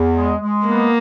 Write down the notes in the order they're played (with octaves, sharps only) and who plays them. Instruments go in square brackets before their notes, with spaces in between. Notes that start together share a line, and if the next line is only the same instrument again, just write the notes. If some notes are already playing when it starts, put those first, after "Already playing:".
Already playing: [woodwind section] E2
G#3
G#3
[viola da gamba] A#3 [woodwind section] B3